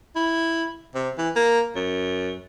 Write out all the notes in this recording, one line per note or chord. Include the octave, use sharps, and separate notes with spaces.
E4
C3
E3
A#3
F#2